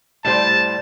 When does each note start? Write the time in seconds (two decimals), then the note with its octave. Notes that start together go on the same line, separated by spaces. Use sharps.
0.25 A2 G3 C5 A5